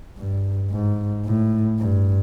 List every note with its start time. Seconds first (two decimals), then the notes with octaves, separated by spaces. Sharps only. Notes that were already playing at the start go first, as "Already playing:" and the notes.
0.17 G2
0.71 G#2
1.25 A2
1.79 G2